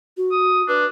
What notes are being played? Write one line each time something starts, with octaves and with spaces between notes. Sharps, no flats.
F#4
D#6
D4 B4